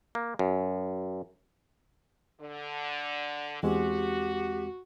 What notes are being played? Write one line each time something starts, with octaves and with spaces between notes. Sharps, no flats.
A#3
F#2
D3
E2 G#3 C4 F#4 G4